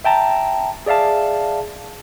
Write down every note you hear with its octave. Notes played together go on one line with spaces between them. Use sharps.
E5 G5 A5 A#5
G#4 D5 E5 F5 A5